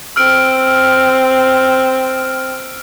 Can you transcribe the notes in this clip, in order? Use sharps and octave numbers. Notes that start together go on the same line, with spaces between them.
C4 E6 F6 D7